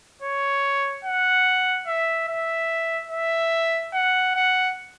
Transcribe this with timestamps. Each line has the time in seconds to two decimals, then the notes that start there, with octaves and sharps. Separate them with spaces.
0.22 C#5
1.05 F#5
1.87 E5
2.28 E5
3.11 E5
3.94 F#5
4.36 F#5